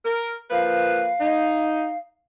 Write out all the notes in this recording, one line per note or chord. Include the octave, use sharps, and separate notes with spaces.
A#4
F3 A#3 B4 F5
D#4